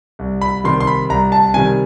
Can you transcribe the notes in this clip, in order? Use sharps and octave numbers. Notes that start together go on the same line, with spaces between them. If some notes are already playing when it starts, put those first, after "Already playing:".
C2
B5
C3 D#3 G3 C6
C6
B5
C2 A#5
A5
C3 D#3 G3 G#5